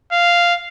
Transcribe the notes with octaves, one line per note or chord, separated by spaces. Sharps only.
F5